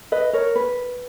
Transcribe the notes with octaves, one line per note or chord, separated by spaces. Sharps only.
B4 D#5
A#4 C#5
B4